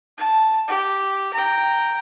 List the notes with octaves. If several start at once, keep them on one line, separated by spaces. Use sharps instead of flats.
A5
G4
G5 A#5